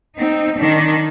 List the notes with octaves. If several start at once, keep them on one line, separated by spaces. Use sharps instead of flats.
C4 D#4
D#3 D4